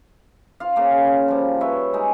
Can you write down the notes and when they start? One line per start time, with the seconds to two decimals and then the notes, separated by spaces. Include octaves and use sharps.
0.60 F4 F5
0.76 C#3 A#3
1.28 F3 G3
1.60 B4 C#5 E5
1.94 G#3 C#4 D#4